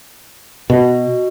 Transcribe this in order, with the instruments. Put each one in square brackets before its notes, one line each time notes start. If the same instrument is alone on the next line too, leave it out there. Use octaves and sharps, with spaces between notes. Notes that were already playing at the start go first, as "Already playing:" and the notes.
[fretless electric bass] B2 [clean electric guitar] F#4 D#5